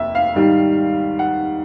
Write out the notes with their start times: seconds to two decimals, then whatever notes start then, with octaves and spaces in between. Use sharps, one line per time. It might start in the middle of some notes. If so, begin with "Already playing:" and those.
Already playing: F1 D#2 E5
0.15 F5
0.35 G#2 D#3 G3
1.19 F#5